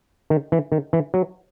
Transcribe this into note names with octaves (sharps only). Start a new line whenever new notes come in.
D#3
E3
D#3
E3
F#3